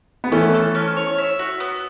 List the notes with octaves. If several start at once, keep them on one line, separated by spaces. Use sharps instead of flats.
B3
E3 A3 C#4
A4
C#4
C#5
E5
F#4
B3